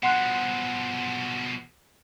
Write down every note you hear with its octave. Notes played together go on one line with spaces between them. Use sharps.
B2 F3 F#5 C6 F#6